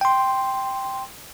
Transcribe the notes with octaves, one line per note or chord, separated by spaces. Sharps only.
G5 C6